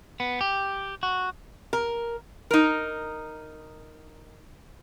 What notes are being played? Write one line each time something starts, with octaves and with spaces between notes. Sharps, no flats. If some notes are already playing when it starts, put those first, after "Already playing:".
B3
G4
F#4
A#4
D#4 A#4